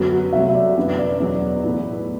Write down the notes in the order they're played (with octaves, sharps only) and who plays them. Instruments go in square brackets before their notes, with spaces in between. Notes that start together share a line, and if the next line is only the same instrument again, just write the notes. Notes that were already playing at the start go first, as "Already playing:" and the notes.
Already playing: [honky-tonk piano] F#2 D3 F#3 B3 [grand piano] F#4
[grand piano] F#4
[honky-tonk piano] C2 C3 F#3 A3 [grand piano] E5
[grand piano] D5
[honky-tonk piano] F#2 E3 B3 D4 [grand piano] B4
[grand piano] D5
[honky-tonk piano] E2 B2 F#3
A2 E3 B3